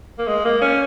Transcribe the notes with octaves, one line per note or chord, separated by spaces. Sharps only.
A#3
G#3
A#3
C#4